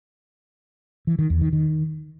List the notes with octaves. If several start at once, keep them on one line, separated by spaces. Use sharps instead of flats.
E3
D#3
E2
D#3
D#3